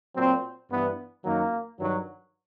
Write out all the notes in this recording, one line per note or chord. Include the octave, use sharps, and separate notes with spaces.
A#2 F#3 C4
G2 E3 B3
F#2 D#3 F#3 A#3
G2 D#3 F#3